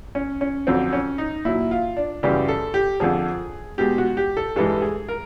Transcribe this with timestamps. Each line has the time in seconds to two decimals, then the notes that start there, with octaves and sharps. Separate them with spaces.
0.15 C#4
0.41 C#4
0.67 F2 D3 F#3 C4
0.93 C#4
1.18 D#4
1.45 A#2 F#3 E4
1.71 F4
1.97 D4
2.23 F#2 C#3 E3 G3 G4
2.48 A4
2.74 G4
3.00 F2 D3 F3 G#4
3.78 B2 G#3 G4
3.98 F#4
4.17 G4
4.37 A4
4.56 G2 E3 G#3 A4
4.82 G#4
5.08 A#4